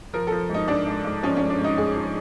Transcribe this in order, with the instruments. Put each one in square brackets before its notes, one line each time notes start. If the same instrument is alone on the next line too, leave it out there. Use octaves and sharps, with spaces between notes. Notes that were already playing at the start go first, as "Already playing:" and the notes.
[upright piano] F3 A#4
A4
F3
G#2 D#4
G#2 D4
G#2
G#2
F3 C#4
C#4
G#2
D4
G#2
D#4
G#2 G#4
F3